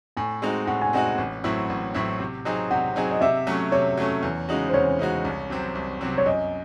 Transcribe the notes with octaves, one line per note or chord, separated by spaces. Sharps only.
A2 G#5
G#3 C4 D#4 F#4
A2 F#5
G#5
G#3 C4 D#4 F#4 F#5
A1
A2 F#3 C4 E4
A1
A2 F#3 C4 E4
C3
F#3 C4 D#4 G#4
C3 F#5
F#3 C4 D#4 G#4
D#5
C3 E5
F#3 A3 C#4
C3 C#5
F#3 A3 C#4
E2
C#3 G#3 D#4 F#4
C5
E2 C#5
C#3 G#3 D#4 F#4
C2
C3 F#3 C4
C2
C3 F#3 C4
C#5
F#2 D#5